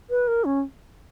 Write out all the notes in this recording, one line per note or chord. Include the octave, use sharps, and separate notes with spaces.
B4
A#4
C#4